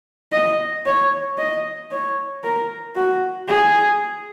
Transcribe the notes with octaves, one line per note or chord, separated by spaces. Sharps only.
D#5
C#5
D#5
C#5
A#4
F#4
G#4